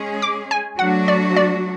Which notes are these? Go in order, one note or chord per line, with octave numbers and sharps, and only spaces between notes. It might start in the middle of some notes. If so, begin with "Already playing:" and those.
Already playing: G#3 C#4 G#4
D6
G#5
F#3 A3 D4 F#4 F#5
D5
D5